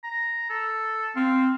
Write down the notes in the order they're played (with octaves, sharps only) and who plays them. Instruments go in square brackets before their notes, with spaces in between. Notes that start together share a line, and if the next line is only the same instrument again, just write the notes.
[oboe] A#5
A4
[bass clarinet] C4 [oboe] F5